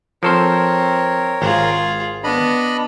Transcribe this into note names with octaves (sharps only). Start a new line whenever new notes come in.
F3 C4 A4 A#4 C5 C#5
G#1 F4 G#4
B3 D4 D#5 B5